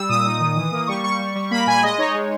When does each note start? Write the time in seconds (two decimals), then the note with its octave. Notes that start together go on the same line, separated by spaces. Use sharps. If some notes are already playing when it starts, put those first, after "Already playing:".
Already playing: G3 E6
0.09 A#2 D#6
0.25 D#4
0.40 D#3
0.56 E3
0.71 A#3
0.87 G3 C#6
1.04 G3 C#6
1.19 G3
1.35 G3
1.51 A#3 B5
1.66 A#2 G#5
1.83 G#3 D#5
1.98 D#4 C#5
2.14 G#3